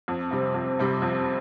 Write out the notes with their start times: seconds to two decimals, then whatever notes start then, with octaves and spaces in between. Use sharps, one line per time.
0.08 F2
0.31 C3 G3 C4
0.54 F2
0.79 C3 G3 C4
1.02 F2